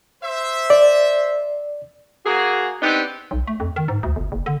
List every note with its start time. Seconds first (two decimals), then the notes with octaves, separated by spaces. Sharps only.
0.23 C5 E5
0.70 D5
2.25 A#3 F#4 G#4
2.81 B3 C4 D4 D#4 G4
3.31 B1
3.47 A3
3.60 F2
3.76 D#3
3.88 G#2
4.03 D2
4.16 G1
4.32 F#1
4.46 D3